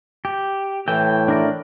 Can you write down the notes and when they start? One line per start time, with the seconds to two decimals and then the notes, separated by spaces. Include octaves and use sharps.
0.25 G4
0.88 A2 E3 G5
1.28 D4 A#4 D5